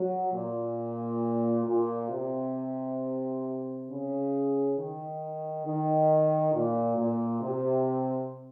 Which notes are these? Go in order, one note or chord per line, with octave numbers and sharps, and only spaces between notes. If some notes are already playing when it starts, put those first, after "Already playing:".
Already playing: F#3
A#2
A#2
C3
C#3
D#3
D#3
A#2
A#2
C3